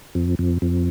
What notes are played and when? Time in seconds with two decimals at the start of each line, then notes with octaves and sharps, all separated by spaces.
0.15 F2
0.39 F2
0.62 F2